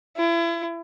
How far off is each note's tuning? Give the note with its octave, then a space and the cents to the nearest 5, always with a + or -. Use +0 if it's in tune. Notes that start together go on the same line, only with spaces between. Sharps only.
E4 +35